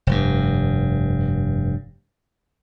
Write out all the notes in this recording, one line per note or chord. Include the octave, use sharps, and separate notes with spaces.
F1 G2